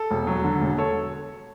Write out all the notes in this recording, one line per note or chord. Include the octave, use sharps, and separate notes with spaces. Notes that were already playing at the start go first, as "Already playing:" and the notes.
Already playing: A4
E1
F#3
D3
E1
A4 C#5